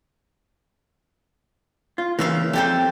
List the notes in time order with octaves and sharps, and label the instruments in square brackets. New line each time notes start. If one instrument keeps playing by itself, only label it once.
[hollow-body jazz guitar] F4
[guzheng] C#3 E5 F5 [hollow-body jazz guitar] E3 A#3
[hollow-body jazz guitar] F2 G5 [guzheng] G4 A4 C5